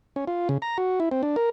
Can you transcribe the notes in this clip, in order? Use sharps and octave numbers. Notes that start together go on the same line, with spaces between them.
C#4
F4
C#3
A#5
F#4
E4
C4
D4
A#4